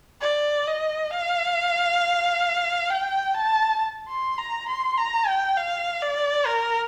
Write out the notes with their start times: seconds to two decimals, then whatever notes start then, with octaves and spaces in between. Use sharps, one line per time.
0.22 D5
0.67 D#5
1.11 F5
2.90 G5
3.35 A5
4.08 C6
4.38 A#5
4.69 C6
4.98 A#5
5.27 G5
5.57 F5
6.02 D5
6.46 A#4